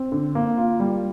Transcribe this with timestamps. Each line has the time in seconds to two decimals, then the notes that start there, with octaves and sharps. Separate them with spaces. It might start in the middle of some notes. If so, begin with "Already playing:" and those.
Already playing: C4
0.12 D3
0.35 A#3
0.57 F4
0.80 G3